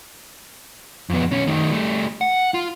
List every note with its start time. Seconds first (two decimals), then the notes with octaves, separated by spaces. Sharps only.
1.10 F2 B3
1.31 B1 C#4
1.47 D#3 A3
1.71 G3 A3
2.21 F#5
2.54 F4